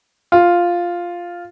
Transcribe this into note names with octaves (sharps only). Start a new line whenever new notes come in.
F4